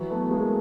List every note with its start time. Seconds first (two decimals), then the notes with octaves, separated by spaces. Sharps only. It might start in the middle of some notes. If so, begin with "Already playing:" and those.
Already playing: E3 F#3
0.10 A3 B3
0.31 G#3 A#3